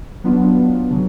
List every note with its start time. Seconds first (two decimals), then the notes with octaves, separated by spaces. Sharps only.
0.24 F#3 B3 D4 F4
0.91 C#3 F#3